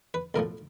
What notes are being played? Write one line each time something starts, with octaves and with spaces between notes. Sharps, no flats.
B4
B1 A2 F3 A#4